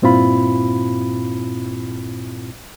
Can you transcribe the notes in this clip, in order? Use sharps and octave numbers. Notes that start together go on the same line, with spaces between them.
G2 A#2 C4 E4 F4 B5